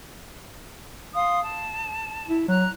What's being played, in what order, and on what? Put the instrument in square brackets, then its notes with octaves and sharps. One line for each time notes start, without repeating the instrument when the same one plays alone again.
[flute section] F5 C6 D#6
A5
[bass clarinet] E4
[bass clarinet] F#3 [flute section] A#5 F#6